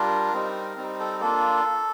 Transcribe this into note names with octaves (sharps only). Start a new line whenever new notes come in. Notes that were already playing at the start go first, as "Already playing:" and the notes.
Already playing: G3 D4 F4 A#4
G3 C4 D#4
G3 C4 D#4
A4
A#3 D4 F4 A4